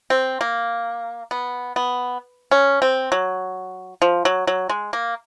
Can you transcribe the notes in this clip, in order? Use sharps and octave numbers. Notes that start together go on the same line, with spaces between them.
C4
A#3
B3
B3
C#4
C4
F#3
F3
F#3
F#3
G#3
A#3